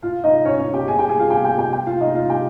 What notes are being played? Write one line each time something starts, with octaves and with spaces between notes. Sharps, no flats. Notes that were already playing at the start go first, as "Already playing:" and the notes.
F4 F5
D#4 D#5
C#4 C#5
C#4 C#5
G4 G5
G#4 G#5
G4 G5
G#4 G#5
F4 F5
G4 G5
G4 G5
G4 G5
G4 G5
F4 F5
D#4 D#5
F4 F5
G4 G5